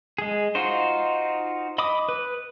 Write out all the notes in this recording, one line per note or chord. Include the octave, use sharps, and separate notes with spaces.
G#3 G#4
D#4 F4 F#4 C5
D#5 B5 D6 D#6
B4